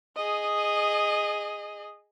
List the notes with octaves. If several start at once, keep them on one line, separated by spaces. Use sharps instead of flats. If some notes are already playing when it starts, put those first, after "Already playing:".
G#4 D#5